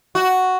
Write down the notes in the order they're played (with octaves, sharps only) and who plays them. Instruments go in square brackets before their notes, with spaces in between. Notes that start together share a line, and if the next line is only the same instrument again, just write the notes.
[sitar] F#4